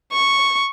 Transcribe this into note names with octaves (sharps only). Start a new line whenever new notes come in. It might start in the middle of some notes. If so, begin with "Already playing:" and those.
C#6